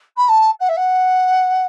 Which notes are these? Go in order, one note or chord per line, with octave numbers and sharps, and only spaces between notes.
B5
A5
F#5
E5
F#5